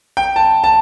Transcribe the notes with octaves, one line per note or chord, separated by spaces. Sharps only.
G5
A5
A5